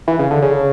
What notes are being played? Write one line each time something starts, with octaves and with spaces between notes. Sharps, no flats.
E3
C#3
D3
C#3